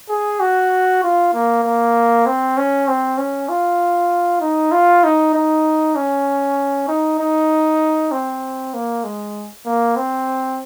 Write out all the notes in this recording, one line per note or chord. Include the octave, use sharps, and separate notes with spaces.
G#4
F#4
F4
A#3
A#3
C4
C#4
C4
C#4
F4
D#4
F4
D#4
D#4
C#4
D#4
D#4
C4
A#3
G#3
A#3
C4